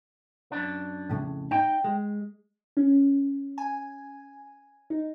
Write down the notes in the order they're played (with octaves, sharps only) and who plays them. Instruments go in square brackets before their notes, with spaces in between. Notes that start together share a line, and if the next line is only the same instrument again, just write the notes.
[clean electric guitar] F#2 D4
[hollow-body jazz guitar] F2 A2 C#3
[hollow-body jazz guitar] D#4 [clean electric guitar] G5
[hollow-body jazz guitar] G#3
[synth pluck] C#4
G#5
D#4